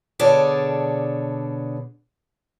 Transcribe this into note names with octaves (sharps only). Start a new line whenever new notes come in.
B2 D3 G#4 C#5 D5 A5